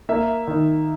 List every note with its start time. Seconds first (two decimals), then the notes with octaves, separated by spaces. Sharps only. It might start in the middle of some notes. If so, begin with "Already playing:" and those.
0.09 A#3 E5
0.47 D#3